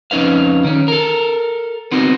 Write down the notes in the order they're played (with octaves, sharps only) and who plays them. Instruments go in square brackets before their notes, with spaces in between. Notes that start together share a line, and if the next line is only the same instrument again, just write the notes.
[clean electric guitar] F2 C#4 D#4 B4 F5
D#3 C#4
A4 A#4
B3 C4 D#4 F#4